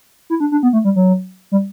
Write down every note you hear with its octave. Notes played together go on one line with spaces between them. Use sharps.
E4
D4
D4
B3
A3
G3
F#3
G3